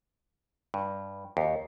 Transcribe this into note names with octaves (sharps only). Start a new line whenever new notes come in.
G2
D#2